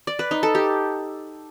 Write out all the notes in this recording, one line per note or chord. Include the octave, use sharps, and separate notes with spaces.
D5
B4
D#4
A4
G4